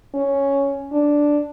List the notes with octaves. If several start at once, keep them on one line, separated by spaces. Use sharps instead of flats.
C#4
D4